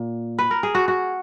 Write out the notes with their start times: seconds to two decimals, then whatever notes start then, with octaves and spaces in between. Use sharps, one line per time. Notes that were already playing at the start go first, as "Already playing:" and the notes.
Already playing: A#2
0.39 B4
0.51 A#4
0.63 G#4
0.75 F#4
0.88 F#4